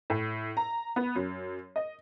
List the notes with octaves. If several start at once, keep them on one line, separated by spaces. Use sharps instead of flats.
A2
A#5
B3
F#2
D#5